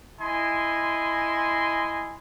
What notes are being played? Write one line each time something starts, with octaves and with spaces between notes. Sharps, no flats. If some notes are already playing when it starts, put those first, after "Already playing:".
E4 D#5 G#5 C6